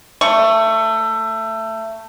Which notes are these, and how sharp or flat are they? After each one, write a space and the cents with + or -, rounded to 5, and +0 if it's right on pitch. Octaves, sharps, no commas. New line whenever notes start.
A3 +20 C#6 +0